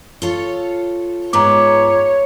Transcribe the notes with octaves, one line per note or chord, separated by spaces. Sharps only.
F4 A4 C#5
G#2 B3 F4 C#5 A#5 D6